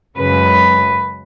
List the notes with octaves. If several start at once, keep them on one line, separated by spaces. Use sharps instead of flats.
F#2 C#3 G#3 B4